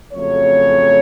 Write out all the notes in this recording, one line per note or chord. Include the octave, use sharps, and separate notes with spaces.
F2 C#3 F#3 A3 C#5